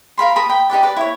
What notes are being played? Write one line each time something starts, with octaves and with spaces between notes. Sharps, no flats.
A#4 F5 B5 C6
A#4 A5 B5 D#6
G5 B5
D#4 G4 B4 D5
B4 D5
E4 C#5